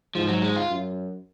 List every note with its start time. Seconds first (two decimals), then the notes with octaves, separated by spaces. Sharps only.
0.15 G#2 F3
0.28 F#3
0.42 G#3
0.56 F4
0.70 F#2